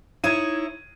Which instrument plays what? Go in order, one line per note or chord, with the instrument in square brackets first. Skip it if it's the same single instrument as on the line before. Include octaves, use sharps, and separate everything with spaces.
[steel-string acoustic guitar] D#4 E4 C#5 [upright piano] G#6 D#7